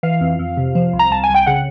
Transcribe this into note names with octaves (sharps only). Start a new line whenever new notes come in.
E3 F5
F2
F2
C3
F3
C2
A#5
C2 A5
G#5
C2
G5
C#3 F#5